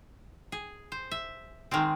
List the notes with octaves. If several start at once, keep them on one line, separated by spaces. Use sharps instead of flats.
G#4
C5
E5
D#3 G#3 C4